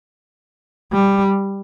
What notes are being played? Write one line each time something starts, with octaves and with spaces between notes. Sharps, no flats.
G3